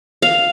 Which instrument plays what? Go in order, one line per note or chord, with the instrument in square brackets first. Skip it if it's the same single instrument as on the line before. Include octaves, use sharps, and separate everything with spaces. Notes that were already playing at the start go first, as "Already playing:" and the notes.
[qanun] F5